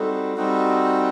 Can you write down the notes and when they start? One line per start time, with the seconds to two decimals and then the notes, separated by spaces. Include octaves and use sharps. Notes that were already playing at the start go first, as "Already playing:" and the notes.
Already playing: G3 C4 D#4 F#4 A4
0.36 G3 C4 D#4 F#4